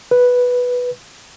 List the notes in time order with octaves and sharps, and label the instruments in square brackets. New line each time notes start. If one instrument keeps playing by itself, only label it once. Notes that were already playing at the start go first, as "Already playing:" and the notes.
[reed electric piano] B4